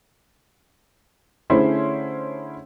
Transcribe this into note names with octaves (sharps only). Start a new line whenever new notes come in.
D3 A3 C#4 E4 G#4 C5